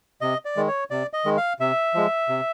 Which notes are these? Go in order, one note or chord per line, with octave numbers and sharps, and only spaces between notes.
C3 D#5
D5
D#3 G#3
C#5
C3 D5
D#5
D#3 G#3
F5
C3 E5
F3 G#3
C3